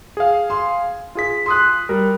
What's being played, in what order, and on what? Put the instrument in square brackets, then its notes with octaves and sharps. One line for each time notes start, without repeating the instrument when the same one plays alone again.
[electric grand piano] G#4 F5
[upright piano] C6
[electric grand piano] F4 G#4 B6
[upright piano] C6 D#6 F#6
[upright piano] G3 [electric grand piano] A#4